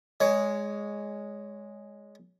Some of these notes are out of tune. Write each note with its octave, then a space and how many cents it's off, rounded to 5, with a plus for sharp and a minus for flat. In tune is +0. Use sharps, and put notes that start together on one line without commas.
G#3 +0 C#5 +20